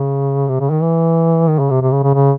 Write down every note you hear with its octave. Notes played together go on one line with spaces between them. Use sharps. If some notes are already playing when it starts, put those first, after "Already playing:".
Already playing: C#3
C3
C#3
D#3
E3
D#3
C#3
C3
C3
C#3
C#3
C#3